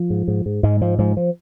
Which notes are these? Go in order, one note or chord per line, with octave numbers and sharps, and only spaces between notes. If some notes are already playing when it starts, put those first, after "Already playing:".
Already playing: F3
G#2
G#2
G#2
G#2 G#3
G#2 F3
G#2 F3
F3